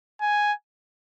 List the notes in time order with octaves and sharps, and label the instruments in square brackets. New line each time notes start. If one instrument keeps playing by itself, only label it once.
[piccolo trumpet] G#5